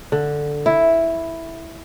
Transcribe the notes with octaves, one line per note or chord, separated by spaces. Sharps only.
D3
E4